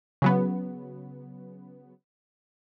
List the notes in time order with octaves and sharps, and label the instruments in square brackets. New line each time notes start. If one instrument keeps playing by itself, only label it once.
[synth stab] C#3 F#3 B3